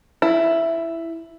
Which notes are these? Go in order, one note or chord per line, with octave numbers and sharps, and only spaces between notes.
E4